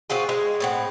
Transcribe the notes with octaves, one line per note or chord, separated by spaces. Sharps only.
C4 F4 F#4 G#4
G#3
A2 C4 F#5